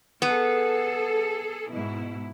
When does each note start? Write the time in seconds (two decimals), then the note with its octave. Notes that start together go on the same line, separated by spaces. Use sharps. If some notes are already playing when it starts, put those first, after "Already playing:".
0.22 B3 G#4 A4
1.72 G#2 B2 E4